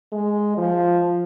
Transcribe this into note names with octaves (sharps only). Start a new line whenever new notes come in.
G#3
F3